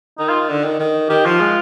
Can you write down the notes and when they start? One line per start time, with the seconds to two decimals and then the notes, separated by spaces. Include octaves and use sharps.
0.19 D#3 D#4
0.29 F4
0.49 D3
0.64 D#3
0.79 D#3
1.09 D#3 G4
1.25 F3 F4
1.40 G#3